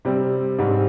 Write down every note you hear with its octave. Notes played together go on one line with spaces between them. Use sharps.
C3 G3 C4
G#2 G3 C4